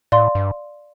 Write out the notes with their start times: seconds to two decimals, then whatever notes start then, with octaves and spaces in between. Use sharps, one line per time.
0.12 A2 D5 F5 C6
0.35 G2